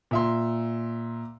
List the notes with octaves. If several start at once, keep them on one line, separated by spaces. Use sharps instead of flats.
A#2 E5 C6